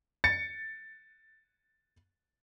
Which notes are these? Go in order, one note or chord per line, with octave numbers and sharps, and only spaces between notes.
A6 C#7